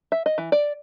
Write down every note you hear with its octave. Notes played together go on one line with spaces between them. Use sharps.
E5
D#5
E3
D5